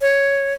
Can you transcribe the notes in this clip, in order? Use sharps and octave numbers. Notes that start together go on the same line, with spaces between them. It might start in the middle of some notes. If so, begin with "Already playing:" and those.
C#5